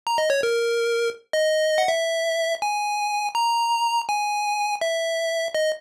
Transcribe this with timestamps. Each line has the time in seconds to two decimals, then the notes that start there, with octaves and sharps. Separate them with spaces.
0.07 A#5
0.18 D#5
0.30 C#5
0.43 A#4
1.33 D#5
1.78 F#5
1.88 E5
2.62 G#5
3.35 A#5
4.09 G#5
4.81 E5
5.55 D#5